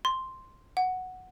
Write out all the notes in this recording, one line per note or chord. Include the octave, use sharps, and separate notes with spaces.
C6
F#5